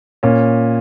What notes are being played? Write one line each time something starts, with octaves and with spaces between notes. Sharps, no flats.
A#2 C#4